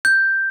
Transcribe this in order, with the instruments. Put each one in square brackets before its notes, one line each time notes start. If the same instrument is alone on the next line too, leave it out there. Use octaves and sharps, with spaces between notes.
[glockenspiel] G6